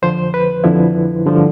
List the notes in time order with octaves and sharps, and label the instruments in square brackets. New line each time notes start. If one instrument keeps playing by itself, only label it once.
[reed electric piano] F2 D3 F3 C5
B4
F2 D3 F3 E4
G2 D3 F3